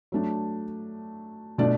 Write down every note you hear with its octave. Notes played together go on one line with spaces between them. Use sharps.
F#3 A3 D4
B2 A3 D4 D5